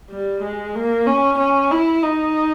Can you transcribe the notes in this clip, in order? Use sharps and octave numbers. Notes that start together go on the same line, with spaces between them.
G3
G#3
A#3
C#4
C#4
E4
D#4